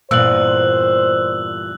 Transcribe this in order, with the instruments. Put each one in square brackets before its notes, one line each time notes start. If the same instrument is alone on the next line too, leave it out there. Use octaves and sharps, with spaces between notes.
[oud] E2 G2 A#2 [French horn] C5 [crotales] E6 F#6 F#7